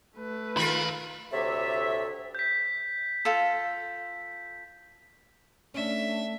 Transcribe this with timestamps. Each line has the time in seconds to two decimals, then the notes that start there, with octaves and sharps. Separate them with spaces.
0.17 A3 B4
0.57 D#3 F4 A4 A#4 B5
1.32 D2 C3 A4 C#5 E5
2.35 G6 B6
3.25 F4 A4
5.74 A3 C#4 D4 E5